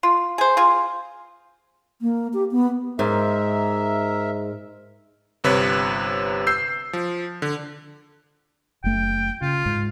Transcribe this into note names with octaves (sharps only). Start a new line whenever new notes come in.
F4
G#4 C5
F4 G#4
A#3
G4
B3
G#2 A#4 E5
G1 C3 B4 C#5 B6
E6 G6 C7
F3
D3
F#1 A3 G5
C#3 F4
G#2